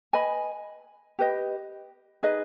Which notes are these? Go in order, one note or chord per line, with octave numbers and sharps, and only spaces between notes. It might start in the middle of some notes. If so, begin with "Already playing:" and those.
B4 D#5 G#5 B5
G4 B4 D#5
D#4 G#4 B4 D#5